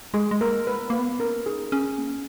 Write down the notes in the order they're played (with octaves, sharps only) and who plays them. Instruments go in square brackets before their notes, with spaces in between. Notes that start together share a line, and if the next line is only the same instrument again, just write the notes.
[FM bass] G#3 [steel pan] G#4
[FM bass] G#3
[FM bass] A#3 [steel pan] A#4
[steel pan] B4
[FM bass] B3
[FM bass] A#3 [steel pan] B4
[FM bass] B3
[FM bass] C#4 [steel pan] A#4
[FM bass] D#4 [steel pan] G#4
[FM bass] C#4 [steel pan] G#4
[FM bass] A#3